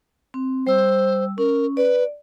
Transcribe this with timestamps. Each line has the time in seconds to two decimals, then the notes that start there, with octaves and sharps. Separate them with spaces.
0.34 C4
0.67 G3 C5 E6
1.38 C#4 A#4
1.77 B4 D5